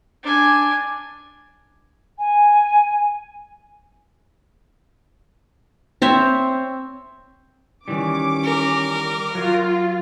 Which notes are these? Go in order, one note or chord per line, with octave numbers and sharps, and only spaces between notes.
D4 G#5
G#5
C4 C5 C#5 E5
D#3 E3 G3 C#4 D6
A#4
F#3 F4 F#4